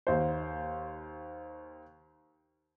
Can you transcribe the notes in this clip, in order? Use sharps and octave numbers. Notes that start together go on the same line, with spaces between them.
D#2 C5